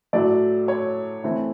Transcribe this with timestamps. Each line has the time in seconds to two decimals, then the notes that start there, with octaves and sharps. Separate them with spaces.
0.13 A2 F#3 A3 D5
0.68 C#5
1.24 E3 A3 C4 E4